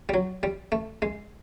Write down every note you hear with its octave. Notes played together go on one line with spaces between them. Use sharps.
G3
F#3
G3
A3
G#3